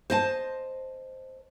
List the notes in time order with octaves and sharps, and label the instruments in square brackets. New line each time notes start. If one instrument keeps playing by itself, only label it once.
[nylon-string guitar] C5 D#5 A5